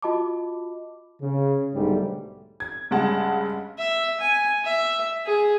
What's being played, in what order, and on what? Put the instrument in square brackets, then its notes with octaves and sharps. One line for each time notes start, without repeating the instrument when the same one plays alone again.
[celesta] F4 F#4 D#5 A5 B5 D6
[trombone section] C#3
B1 G#2 D3 G3 A3
[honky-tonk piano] G#6
G2 C#3 G#3 F#5 A5
[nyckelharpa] E5
G#5
E5
G#4